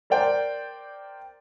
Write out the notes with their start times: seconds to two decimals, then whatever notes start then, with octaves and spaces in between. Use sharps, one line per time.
0.10 A#4 C5 D5 G5